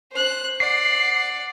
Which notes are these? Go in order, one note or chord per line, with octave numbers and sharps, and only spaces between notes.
C5 F#6
D5 F#5 C7